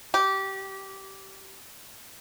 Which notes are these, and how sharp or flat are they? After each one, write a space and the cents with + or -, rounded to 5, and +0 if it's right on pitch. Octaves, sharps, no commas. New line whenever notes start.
G4 -20